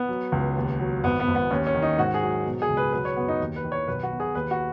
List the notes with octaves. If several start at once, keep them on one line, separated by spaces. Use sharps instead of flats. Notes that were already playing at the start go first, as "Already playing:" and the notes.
Already playing: B3
F#3
C#2
D#2
F#3
G#1 B3
B3
G#1
B3
D#2 C#4
C#4
D#3
D#4
G#2 F#4
G#4
F#3
B2
G#4
C#2
B4
F#3 B4
C#5
F#2 B3
D#4
D#2
B4
D#3
C#5
B1 B4
F#4
B2
G#4
D#2 B4
F#4